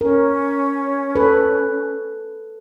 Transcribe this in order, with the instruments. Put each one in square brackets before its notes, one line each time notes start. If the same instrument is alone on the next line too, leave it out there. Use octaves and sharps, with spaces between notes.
[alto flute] C#4 [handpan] A#4
[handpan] A4 B4